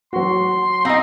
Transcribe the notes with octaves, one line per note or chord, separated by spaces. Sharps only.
F#3 F#4 C6
C4 D#4 D#5 F5 A#5 E6